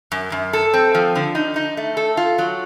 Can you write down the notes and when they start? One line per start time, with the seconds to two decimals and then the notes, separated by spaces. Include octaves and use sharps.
0.12 F#2
0.32 F#2
0.53 A4
0.74 C4
0.95 F3
1.15 D3
1.35 D#4
1.56 D#4
1.77 A3
1.97 A4
2.17 F4
2.38 F#3